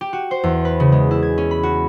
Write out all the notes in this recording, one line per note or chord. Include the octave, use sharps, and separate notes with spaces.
G4
F#4
C5
E2
B4
C#3
G#3
E4
G#6
C#4
B5
F#4